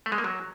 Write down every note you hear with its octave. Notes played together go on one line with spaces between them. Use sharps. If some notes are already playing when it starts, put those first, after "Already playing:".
A3
G#3
A#3
F#3